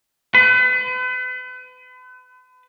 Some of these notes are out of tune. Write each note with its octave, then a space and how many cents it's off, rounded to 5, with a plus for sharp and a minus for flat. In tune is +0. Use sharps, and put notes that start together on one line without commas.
B4 +40